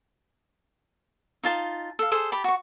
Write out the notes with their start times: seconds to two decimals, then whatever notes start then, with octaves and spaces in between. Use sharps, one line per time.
1.43 D#4 F4 A5
1.99 A4 F5
2.11 G#4 A4 C5
2.32 G4 A5 B5
2.44 F#4 C#6